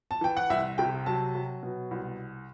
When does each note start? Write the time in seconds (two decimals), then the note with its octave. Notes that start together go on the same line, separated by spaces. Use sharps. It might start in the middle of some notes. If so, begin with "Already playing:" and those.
0.11 A5
0.21 E3 G5
0.37 F#5
0.50 C2 E5
0.78 C3 G5
1.06 F#3 A5
1.35 F#3
1.63 B2
1.91 C2